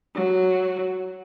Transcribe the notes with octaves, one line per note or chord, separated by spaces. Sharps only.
F#3 F#4